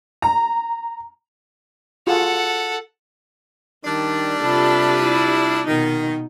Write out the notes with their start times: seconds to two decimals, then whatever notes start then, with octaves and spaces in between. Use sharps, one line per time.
0.22 A#5
2.07 F4 F#4 G#4 A4 F#5
3.85 D#3 G3 D4
4.42 C3 F4 A4 B4 B5
5.02 E4
5.67 B2 D#3 D#4